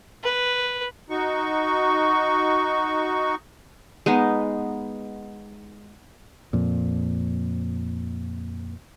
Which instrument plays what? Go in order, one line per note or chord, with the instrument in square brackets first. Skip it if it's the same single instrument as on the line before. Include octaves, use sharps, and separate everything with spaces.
[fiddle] B4
[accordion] D#4 F#4 C#6
[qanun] G#3 B3 D#4
[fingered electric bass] F2 A#2